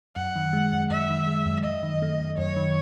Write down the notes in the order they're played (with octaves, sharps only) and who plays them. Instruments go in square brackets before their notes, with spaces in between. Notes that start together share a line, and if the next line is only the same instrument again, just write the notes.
[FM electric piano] F#2 [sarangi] F#5
[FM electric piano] D#3
G#3
F#2
[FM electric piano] F#2 [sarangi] E5
[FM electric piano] D#3
G#3
F#2
[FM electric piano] F#2 [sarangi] D#5
[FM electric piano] D#3
A3
F#2
[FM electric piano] F#2 [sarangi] C#5
[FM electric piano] D#3